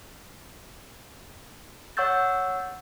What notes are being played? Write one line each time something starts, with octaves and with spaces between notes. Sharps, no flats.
C#5 F#5 C#6 E6 G6 A6